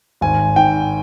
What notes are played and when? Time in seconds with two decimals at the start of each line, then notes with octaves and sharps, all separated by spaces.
0.21 G#1 G#5
0.56 G#2 G5